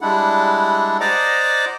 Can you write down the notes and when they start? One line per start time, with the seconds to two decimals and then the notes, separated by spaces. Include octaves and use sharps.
0.01 G3 G#3 D4 E4 F#5
1.00 C5 D5 D#5 F#5 A#5 D6